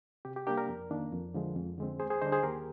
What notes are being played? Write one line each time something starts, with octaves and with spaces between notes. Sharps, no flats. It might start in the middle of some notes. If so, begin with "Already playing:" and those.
C3 G4
G4
G3 A#3 D4 G4 A#4
A#4 D5
F2
D#3 A#3 D4
F2
D3 F3 G#3
F2
D3 G#3 C4
D#2 G#4 C5
G#4 C5
D3 G3 D4 C5 D#5
G#4 C5
D#2 G4 A#4